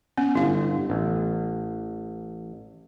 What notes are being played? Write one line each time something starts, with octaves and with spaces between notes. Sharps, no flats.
B3 C#4
G1 E4 F5
A1